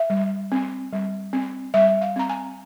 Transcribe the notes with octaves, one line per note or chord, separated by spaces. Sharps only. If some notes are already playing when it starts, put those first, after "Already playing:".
Already playing: E5
G3
C4
G3
C4
G3 E5
F5
C4 A#5
G#5